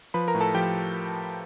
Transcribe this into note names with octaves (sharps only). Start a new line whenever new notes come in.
F3 B4 B5
A#4 A#5
A2
A4 A5
F3 G4 G5